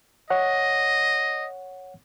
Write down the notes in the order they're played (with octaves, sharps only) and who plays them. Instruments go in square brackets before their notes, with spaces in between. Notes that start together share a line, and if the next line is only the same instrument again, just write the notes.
[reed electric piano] C#5 F#5 [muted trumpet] D#5